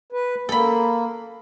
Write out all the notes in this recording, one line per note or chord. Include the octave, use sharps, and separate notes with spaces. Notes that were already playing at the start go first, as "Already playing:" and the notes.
B4
A#3 A4 B5